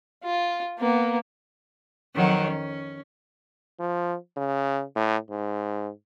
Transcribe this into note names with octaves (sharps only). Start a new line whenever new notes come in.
F4
A#3 B3
F2 D#3 F#3
C#4
F3
C#3
A2
G#2